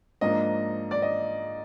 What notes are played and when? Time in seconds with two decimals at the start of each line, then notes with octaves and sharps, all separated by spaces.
0.21 G#2 F3 A#3 D4 D#5
0.91 D5
1.02 D#5